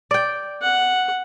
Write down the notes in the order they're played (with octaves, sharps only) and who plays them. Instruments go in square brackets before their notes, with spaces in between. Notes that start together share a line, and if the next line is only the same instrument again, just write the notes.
[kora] D5 G5
[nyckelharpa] F#5